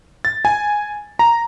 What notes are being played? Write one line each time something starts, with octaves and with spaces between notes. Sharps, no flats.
A6
G#5
A#5